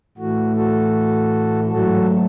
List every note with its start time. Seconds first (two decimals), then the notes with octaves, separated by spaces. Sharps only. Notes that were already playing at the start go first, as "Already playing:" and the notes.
0.17 A2 E3 A3 F#4
0.56 F#4 A4
1.72 G#2 F#3 A3 F#4 A4